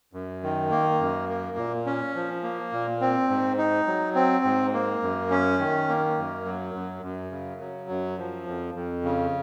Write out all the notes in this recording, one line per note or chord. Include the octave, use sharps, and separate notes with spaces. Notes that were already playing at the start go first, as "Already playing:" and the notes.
F#2
D#3
A#3
F#2
A#3
A#2
C#4
F3
A#3
A#2
C4
G#2
D#4
F#3
C4
G#2
A#3
F#2
C#4
D#3
A#3
F#2
F#3
F#2
F#2
C#3
F#3
F#2
F3
F2
F2
C#3